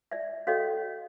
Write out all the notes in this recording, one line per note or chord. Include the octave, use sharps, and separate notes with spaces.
D5 E5
C#4 F#4 A4 C#5 D#5 F5